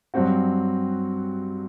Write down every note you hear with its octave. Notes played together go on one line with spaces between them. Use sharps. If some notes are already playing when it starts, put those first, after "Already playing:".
G2 F#3 C4 F#4